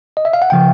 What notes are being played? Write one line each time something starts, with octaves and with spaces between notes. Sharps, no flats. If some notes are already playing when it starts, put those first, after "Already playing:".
D#5
E5
F5
F#5
C#3 F3 G5